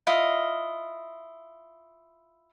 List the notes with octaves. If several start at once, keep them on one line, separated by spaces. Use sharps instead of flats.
E4 F4 D#5 F5